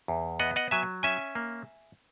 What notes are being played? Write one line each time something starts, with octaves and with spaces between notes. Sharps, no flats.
E2
B3 D#5 F#5
D#5 F#5
F#3 E5 G#5
C#4 E5 G#5
A#3